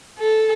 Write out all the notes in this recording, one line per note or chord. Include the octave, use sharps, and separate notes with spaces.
A4